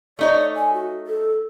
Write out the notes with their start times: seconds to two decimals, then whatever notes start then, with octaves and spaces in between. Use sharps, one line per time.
0.19 A3 D#4 C#5 D5
0.55 G#5
0.74 F#4
1.07 A4